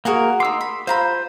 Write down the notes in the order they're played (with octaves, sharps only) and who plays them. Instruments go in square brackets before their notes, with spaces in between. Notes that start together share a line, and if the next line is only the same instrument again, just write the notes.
[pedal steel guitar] A#3 A#4 [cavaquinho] F#4 G#4 F#5
[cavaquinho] D#4 D6 [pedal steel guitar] C6 E6
[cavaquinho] B5
[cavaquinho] F4 A#5 B5 [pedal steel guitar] C5